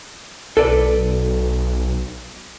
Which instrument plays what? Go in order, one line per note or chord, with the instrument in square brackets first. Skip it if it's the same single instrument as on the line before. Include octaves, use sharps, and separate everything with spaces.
[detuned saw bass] B1 [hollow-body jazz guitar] A4 B4 D5